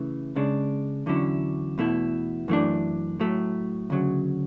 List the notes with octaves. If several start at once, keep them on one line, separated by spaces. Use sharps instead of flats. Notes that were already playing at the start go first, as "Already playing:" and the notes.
Already playing: C#3 E3 A3
C#2 C#3 G#3 D4
E2 D3 F#3 C#4 E4
E2 B2 A3 E4
F#2 E3 A3 D4
A2 F#3 A3
D2 C#3 F#3